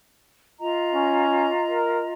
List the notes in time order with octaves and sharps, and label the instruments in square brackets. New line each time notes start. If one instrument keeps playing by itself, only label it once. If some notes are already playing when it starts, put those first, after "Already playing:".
[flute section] F4 D#5 A#5
[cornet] C#4
A#4